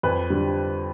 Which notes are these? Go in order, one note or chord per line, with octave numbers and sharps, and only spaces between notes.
F2 B4
D3 G3